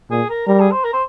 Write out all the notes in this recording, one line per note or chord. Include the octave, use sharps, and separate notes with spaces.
A#2 G#4
A#4
G3 A#4
G#4
C5
A#4
C5